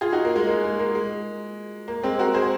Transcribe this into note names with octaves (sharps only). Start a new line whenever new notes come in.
F4 G#4
D#4 F#4
A#3
G#3
A#3
G#3
A#3
G#3
A#3
G#3 C4
F#4 A#4
G#4 C5